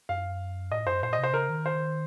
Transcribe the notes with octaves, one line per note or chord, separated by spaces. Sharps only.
F#2 F5
A2 D#5
F#2 C5
A#2 C5
D#5
C3
C5
C#3 A#4
D#3
C5